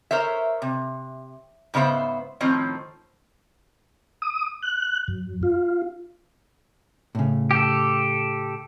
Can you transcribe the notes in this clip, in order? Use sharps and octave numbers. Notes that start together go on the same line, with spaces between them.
A#4 C5 C#5 E5
C3
G#2 C#3 B3 C5 E5
A2 D#3 F3 C4 C#4
D#6
F#6
F#2
F4
A2 C#3
G4 A4